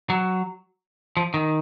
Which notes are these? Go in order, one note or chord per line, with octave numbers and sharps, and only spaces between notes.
F#3
F3
D#3